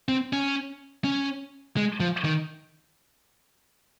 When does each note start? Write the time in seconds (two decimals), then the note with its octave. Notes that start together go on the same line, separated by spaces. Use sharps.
0.09 C4
0.33 C#4
1.04 C#4
1.77 G#3
2.00 F3
2.25 D#3